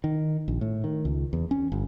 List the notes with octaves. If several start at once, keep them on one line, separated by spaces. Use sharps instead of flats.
D#3
A#1
A2
D#3
C#2
E2
C#4
G1